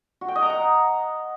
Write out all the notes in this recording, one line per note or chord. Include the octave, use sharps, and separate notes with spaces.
F#4
G5
D#5
A#5
F#5